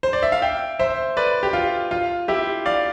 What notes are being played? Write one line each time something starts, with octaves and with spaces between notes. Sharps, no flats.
C5
D5
E5
F5
E5 G5
C5 E5
B4 D5
G4
F4
F4
E4 G4
D5 F5